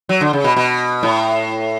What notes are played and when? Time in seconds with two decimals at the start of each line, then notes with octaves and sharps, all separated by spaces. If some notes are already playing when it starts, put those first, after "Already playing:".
0.09 F#3
0.21 D3
0.33 C#3
0.44 B2
0.56 B2
1.03 A2